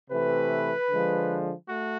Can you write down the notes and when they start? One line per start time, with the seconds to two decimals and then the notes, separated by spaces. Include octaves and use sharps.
0.10 C3 E3 A3 B4
0.89 D3 F3 G#3
1.68 A3 F#4